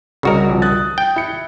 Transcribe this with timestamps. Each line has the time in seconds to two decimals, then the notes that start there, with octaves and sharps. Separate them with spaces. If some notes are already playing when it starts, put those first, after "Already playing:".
0.23 C2 C#3 F#4 A#4 D#5
0.49 C2 F3
0.62 D#6 F#6 A6
0.98 G5
1.16 E4 C#7